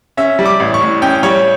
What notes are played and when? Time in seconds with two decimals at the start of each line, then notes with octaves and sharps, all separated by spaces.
0.17 C#4 E5
0.39 G3
0.46 D6
0.60 A1
0.74 C#6
0.81 A2
1.02 C#4 G5
1.23 G3 C#5